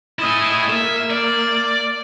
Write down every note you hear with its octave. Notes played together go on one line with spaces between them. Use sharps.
A3 E4 D#5 G#5
A#3 E5
D5